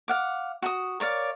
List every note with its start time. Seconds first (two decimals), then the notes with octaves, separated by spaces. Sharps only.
0.08 F5 F#5 D6
0.62 F#4 A#5 D#6
1.00 A#4 C#5 D5 F5